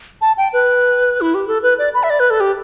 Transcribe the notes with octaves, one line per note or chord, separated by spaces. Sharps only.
A5
G5
B4
E4
G4
A4
B4
D5
B5
E5
D5
B4
A4
G4